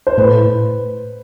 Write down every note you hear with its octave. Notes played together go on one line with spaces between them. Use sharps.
C5
A2 B4